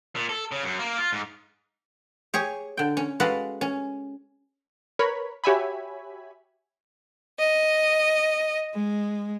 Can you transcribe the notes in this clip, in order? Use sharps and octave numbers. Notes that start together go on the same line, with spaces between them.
A#2
A4
C#3
F#2
A#3
F4
G#2
G4 G#4 C#5
D3 G5
C#4
G#3 F#4 A4 B4 F5
C#4
A#4 B4 C#5 B5
F#4 G4 C#5 E5 G#5 B5
D#5
G#3